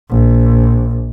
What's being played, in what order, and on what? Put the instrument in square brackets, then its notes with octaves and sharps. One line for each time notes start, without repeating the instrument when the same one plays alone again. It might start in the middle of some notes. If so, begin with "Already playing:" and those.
[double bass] A#1